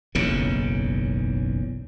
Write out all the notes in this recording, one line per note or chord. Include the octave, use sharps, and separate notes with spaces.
F#1 B1 E2 C#3